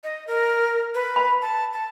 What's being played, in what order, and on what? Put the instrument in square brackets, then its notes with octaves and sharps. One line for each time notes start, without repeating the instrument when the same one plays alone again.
[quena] D#5
A#4
B4
[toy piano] B5
[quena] A5
A5